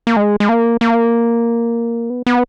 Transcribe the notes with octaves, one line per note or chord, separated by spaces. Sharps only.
A#3
G#3
G#3
A#3
A#3
B3
B3